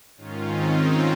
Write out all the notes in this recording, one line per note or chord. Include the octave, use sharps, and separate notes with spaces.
G#2 D#3 C#4 F4
C4 D#4
C#4 F4